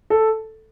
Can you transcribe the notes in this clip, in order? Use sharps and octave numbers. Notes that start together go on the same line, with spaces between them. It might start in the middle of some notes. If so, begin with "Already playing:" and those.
A4